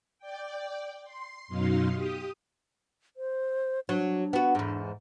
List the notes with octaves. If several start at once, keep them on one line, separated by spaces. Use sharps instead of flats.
D5 G5
C6
F#2 B2 F#3 D#4 F5 C6
G4 D#6
C5
F#3 D4
B3 F#4
E2 G#2